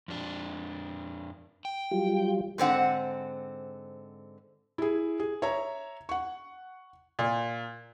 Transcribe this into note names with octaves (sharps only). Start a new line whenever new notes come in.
F2 D4
G5
F#3 G3 F4
G#2 D3 C4 F#5
E4 G#4
G#4
C#5 E5 A#5
F#5 C#6
A#2